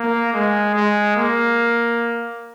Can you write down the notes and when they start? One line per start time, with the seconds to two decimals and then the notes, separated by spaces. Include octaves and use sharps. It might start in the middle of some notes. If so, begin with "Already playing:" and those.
Already playing: A#3
0.34 G#3
0.75 G#3
1.17 A#3